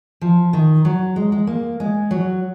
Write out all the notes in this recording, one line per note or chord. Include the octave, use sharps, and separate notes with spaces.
F3
D#3
F#3
G#3
G#3
A#3
G#3
F#3